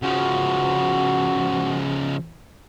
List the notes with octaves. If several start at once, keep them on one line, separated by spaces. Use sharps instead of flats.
C#3 F3 F#4